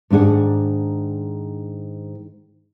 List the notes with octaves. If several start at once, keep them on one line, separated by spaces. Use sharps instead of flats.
G#2 D#3 D4 G#4 F#5